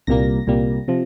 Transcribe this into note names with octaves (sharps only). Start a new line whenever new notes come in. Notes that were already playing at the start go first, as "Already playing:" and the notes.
C2 A#2 G3 A#3 A#6
C2 A#2 G3 A#3
C3 F3